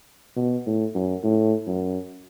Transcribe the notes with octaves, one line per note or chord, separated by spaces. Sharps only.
B2
A2
F#2
A2
F#2